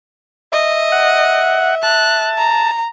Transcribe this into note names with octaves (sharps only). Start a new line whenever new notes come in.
D#5 E5
F#5
A5 F#6
A#5